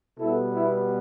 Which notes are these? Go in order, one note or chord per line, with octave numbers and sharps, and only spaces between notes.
B2 G3 B3 E4 A4
E4